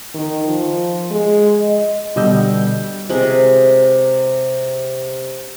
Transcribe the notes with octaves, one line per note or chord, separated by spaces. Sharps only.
D#3
F3
G#3
D#5
B2 D3 G3 D#5 E6 G6
C3 G#3